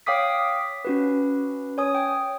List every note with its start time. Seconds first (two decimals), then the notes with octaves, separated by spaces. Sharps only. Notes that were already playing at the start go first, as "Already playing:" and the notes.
0.06 C#5 F5 G5 D6 D#6 B6
0.85 C#4 F#4 B4
1.78 C#5 G#5 D#6
1.95 G5